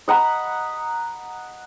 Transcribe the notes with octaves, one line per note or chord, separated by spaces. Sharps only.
D#5 F#5 A#5 B5